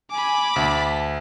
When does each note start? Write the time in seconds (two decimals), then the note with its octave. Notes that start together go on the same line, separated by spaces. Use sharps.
0.10 G#5 B5 D6
0.56 D2 A5 B6